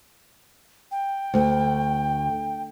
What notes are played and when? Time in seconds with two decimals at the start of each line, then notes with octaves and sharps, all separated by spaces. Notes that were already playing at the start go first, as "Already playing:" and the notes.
0.91 G5
1.34 D2